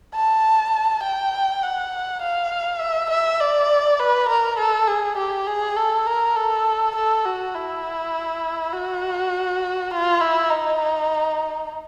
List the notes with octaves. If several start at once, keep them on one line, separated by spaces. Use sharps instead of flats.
A5
G5
F#5
F5
E5
E5
D5
B4
A#4
A4
G#4
G4
G#4
A4
A#4
A4
A4
F#4
E4
F#4
F4
E4
D#4